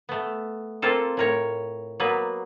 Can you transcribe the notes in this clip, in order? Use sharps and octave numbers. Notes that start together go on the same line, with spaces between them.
A3 B3
A#3 C4 F4 A4
A2 A#4 C#5
F#3 A#3 B3 B4